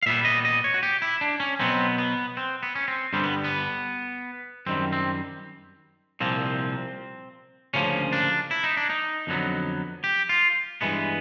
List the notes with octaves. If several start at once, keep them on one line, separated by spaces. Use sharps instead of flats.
F5
A#2 G3 B3 E5
D#5
D#5
C#5
F#4
G4
E4
D4
C#4
B2 F#3 B3 C4
B3
C4
B3
C#4
C4
G2 D3 G3 B3 C4
B3
B3
F#2 D#3 G3 C4
C4
C2 A#2 F3 A#3 C4
D2 C#3 F3 A#3 C#4
D4
E4
D#4
D4
D#4
F2 D3 F#3 B3
G4
F4
G2 E3 G#3 B3